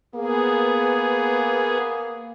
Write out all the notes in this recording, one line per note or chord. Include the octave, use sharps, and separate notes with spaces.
A#3 B3 G#4